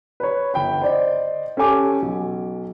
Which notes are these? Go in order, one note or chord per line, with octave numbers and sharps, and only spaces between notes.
B4 C#5
G1 G5 B5
C5 D5 D#5
C#4 G4 A4 G#5 D6
B1